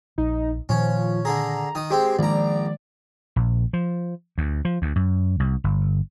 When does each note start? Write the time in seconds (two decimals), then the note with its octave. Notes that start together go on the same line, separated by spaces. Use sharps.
0.18 A#1 D#4
0.69 A#2 D#3 F3 C#4
1.25 D3 G#4 A#5
1.75 D#3 D#6
1.90 G#3 C4 G4
2.19 A#1 D#3 G#3 D5 A#5
3.36 A#1
3.73 F3
4.38 D2
4.65 F3
4.82 D2
4.96 F#2
5.40 C2
5.64 G1